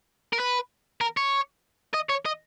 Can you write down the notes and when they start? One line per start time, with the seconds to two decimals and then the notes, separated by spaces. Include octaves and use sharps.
0.33 A#4
0.40 B4
1.01 A#4
1.17 C#5
1.94 D#5
2.09 C#5
2.26 D#5